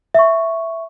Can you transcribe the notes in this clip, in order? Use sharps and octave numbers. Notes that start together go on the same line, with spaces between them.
E5 C#6